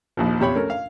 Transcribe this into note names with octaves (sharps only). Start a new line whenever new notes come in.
A#1 D#2 F3
E2 C3 G4 C#5 B5
A3 C#4 A#4
F5